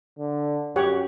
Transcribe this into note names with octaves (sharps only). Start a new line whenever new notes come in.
D3
F#2 G4 C#5 F#5